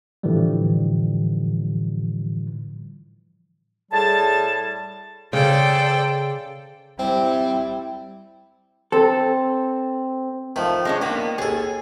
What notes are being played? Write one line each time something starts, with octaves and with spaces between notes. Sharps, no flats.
A2 D3 E3 F3 G3
A2 G3 G#4 A5
C#3 A4 C5 D5 G5
G3 C4 E4
C4 A4
D#3 F3 A3
G#3 C#4 D4
D#3 A#3 B3
D#2 G#4 A4 G#5